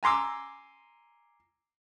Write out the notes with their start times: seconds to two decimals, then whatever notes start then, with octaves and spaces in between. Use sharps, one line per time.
0.03 G#5 A#5 C6 D6 E6